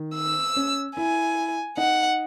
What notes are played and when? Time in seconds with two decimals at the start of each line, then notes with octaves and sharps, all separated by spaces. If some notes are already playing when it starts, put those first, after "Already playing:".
Already playing: D#3
0.15 E6
0.56 C#4
0.97 E4 G#5
1.77 D#4 F#5